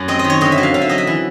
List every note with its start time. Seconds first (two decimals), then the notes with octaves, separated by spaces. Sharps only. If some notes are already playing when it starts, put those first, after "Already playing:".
Already playing: F#2
0.08 C4 D#5
0.19 D#5
0.24 D#3
0.30 C#5
0.41 D3 D#5
0.52 E5
0.58 F#3
0.63 F5
0.74 D3 F5
0.82 E5
0.89 F#3 D#5
0.98 E5
1.07 E3